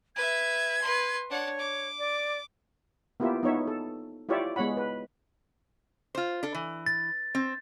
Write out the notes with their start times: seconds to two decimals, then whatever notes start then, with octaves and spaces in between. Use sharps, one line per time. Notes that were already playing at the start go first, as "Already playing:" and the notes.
0.16 B4 E5 G#6
0.82 B4 C6
1.30 D4 C#5 F#5
1.59 D6
1.99 D5
3.20 A#3 B3 E4 F4 G4 E5
3.43 B3 D#4 C#5 E5
3.68 A4
4.29 E4 F4 G4 C#5 D5 E5
4.56 G#3 B3 C#5 F#5 B5
4.77 B4
6.15 F4 C5
6.43 D4 A4
6.55 E3
6.86 A6
7.35 C4